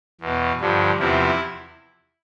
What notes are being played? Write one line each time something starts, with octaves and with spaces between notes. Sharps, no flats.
E2 B2
G2 D3 F3
E2 C3 F3 E4